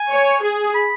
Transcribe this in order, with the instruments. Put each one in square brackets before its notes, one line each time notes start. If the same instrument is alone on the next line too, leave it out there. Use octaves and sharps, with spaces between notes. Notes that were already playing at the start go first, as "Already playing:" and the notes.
Already playing: [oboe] G#5
[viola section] C#5
G#4
[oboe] B5